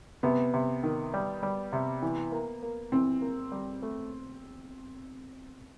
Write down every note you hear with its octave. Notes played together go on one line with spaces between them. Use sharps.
C3 B3
C3
D#3
G3
G3
C3
E3
A#3
A#3
E3 C4
A#3
G3
A3